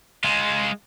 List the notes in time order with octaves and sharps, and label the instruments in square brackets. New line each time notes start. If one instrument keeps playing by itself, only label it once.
[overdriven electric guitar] G#3 F4